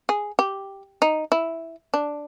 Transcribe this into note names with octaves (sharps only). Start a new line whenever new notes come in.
G#4
G4
D#4
E4
D4